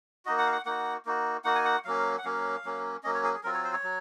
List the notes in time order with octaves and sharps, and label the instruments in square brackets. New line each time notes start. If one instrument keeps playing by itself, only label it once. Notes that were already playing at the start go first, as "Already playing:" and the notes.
[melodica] A#3 D#4 F#4 D#5
F#5
F5
F#5
A#3 D#4 F#4 F#5
A#3 D#4 F#4
A#3 D#4 F#4 F#5
G#5
F#5
F#3 A#3 C#4 F5
F#5
F#3 A#3 C#4 F5
F#3 A#3 C#4
F#3 A#3 C#4 D#5
C#5
G#4
G#4
F#3 C4 F4 A#4
C#5
C5
C#5
F#3